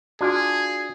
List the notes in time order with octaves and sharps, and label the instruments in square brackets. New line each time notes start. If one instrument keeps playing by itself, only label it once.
[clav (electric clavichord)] D4 F4 [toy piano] F#4 G#5 [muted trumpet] G#4